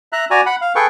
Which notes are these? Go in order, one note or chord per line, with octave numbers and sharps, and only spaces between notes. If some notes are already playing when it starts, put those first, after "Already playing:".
E5 A#5 F#6
F#4 D5 G#5 A#5
F#5 B5
F5
G#4 A4 B4 G5 C#6